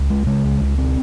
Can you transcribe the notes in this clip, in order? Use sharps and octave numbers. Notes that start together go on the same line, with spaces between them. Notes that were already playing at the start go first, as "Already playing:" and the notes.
Already playing: C#2
C#3 G#3
C#3 G#3
C#2
C#2
C4